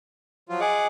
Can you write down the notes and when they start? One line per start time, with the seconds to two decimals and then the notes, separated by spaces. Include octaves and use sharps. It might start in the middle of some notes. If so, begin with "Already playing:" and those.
0.49 F3 F#3 F4
0.60 G#4 D#5 F#5 G#5 D6